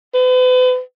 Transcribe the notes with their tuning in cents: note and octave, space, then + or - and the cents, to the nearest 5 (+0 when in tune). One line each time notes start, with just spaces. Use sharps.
B4 +40